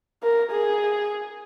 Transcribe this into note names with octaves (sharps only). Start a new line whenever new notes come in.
A#4
G#4